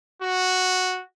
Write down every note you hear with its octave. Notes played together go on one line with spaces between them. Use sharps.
F#4